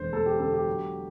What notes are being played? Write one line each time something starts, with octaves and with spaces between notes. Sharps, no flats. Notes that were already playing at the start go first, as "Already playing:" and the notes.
Already playing: E1 D3 C5
E1 A4
G4
D3 A4
G4
F#3